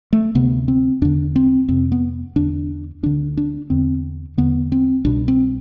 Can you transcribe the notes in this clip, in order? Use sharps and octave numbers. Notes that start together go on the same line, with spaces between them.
A3
D2 C3 B3
C4
E2 D3 D4
C4
F2 C3 C4
B3
E2 D3 D4
D2 D3 D4
D4
E2 D3 C4
E2 D3 B3
C4
C2 B2 D4
C4